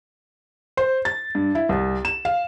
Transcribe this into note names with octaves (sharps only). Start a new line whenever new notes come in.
C5
A6
G2
E4
C2
E7
F5